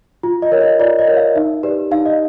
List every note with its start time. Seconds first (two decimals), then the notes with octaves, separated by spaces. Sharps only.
0.23 F4
0.42 D#5
0.52 A#4 C#5
0.61 D#5
0.79 F4 D5
0.99 D#5
1.07 A#4 C#5
1.17 F5
1.36 D#4 E5
1.63 G4 B4 D5
1.91 D#4 F5
2.06 D#5